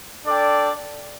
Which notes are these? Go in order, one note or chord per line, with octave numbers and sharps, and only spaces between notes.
D4 A4 D5 G5